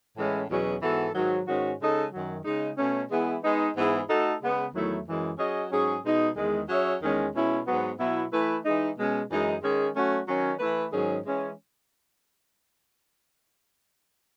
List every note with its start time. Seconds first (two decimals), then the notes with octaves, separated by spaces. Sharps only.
0.17 A2 E3 G#3 C#4
0.50 E2 B2 F#3 C#4 G#4
0.82 G#2 E3 B3 F#4 A4
1.15 G#2 D#3 F#3
1.47 G#2 D#3 G#3 C#4 F#4
1.80 C#3 G#3 D#4 A4 D#5
2.13 F#2 D#3 F#3
2.45 C#3 G#3 D#4
2.78 B2 A3 C#4
3.11 E3 G#3 B3 E4 G#4
3.43 G#3 B3 D#4
3.75 G#2 E3 B3 E4 G#4
4.09 A3 D#4 F#4 A4
4.41 C#3 G#3 B3
4.73 E2 D#3 F#3 A3 E4
5.06 F#2 E3 G#3
5.39 F#3 C#4 G#4 D#5
5.71 G#2 F#3 C#4 G#4
6.03 B2 G#3 D#4
6.36 E2 D#3 G#3
6.69 F#3 C#4 G#4 C#5 E5
7.02 E2 D#3 G#3 C#4
7.34 B2 G#3 C#4 E4
7.66 G#2 F#3 B3
7.99 B2 F#3 B3 E4
8.32 E3 A3 E4 B4
8.65 E3 G#3 D#4
8.96 B2 G#3 C#4
9.30 F#2 E3 G#3 D#4 G#4
9.62 D#3 G#3 C#4 G#4
9.95 F#3 A3 C#4 F#4
10.28 D#3 F#3 C#4
10.59 E3 A3 E4 B4
10.92 G#2 D#3 F#3 C#4 G#4
11.25 E3 G#3 C#4